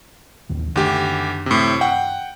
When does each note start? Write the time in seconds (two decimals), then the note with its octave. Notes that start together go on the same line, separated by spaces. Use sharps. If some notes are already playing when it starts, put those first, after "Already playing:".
0.49 A1 D#2 D#3
0.76 F#1 D2 D#3 D4 G4
1.46 A2 C3
1.81 F#5 G5